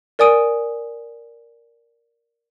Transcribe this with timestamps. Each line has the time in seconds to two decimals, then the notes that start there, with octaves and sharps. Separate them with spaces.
0.19 A#4 D5 G#5 D#6 D7 D#7